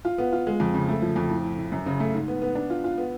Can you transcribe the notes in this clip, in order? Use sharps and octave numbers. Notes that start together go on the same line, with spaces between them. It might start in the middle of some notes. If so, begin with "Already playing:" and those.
F4
B3
F4
G#3
F2
C#3
A3
F3
F2
A2
A2
A2
F#2
C#3
A3
G#2
B3
B3
D4
F4
F4
B3